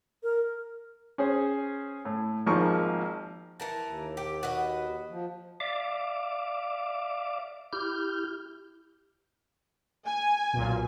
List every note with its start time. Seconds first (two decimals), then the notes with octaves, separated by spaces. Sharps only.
0.23 A#4
1.18 C#4 G#4 C5
2.05 A2
2.46 G#1 F3 A#3 D#4 G#4 C#6
3.60 E3 A#4 A5
3.85 D#2
4.17 G4
4.43 F#4 B4 D#5
5.10 F3
5.60 D5 E5 F5 D6
7.73 E4 G4 F6 G6
10.07 G#5
10.53 B1 A#2